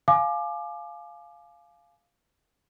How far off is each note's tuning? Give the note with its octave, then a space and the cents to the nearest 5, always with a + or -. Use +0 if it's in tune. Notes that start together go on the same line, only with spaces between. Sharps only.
F5 +0 G#5 +30 D6 +20